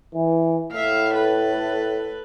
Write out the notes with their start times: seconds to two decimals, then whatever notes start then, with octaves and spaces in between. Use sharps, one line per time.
0.14 E3
0.72 A2 E5 F5
1.14 A4 B4